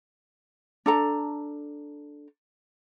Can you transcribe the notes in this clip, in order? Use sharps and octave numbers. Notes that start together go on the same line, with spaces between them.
D4 A4 A#5